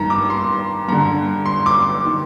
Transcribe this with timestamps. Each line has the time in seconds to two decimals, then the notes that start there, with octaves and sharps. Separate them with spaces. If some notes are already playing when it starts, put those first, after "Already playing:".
Already playing: G2 D#3 A#5
0.10 D6
0.30 C6
0.88 G2 D3 A#5
1.46 C6
1.66 D6
2.05 D#3